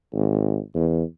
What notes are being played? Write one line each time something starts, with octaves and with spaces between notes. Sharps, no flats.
G#1
E2